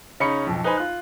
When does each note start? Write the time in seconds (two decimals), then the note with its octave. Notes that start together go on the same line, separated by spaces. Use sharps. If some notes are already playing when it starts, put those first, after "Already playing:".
0.20 C#3 C#4 D#4 B5 C#7
0.46 B1 F2
0.64 D#4 B4 C5 G#5 B5
0.77 F4 F#6